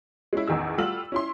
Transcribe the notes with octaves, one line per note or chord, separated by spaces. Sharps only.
G#3 C#4 E4
A1 E2 D#3 G#4 E6
G3 A3 F4 F#4 E6 F#7
C#4 E4 C6